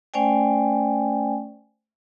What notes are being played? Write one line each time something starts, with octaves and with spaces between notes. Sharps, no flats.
A3 C#4 C5 D5 G5 G#5